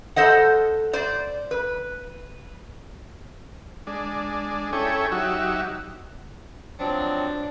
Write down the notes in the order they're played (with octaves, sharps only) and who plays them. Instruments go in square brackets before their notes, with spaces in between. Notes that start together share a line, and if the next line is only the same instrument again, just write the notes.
[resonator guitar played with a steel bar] A4 C5 D#5 F#5
C5 D5
B4
[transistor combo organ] G#3 D4
C#4 E4 G#4 A4 C#5 G5
F#3 D#4 F#4 G4 E5
[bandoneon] F3 F#3 C4 [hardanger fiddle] D4